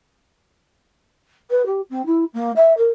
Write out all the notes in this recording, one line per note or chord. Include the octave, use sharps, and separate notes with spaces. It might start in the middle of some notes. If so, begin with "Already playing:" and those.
B4
G4
C4
E4
A#3
E5
A#4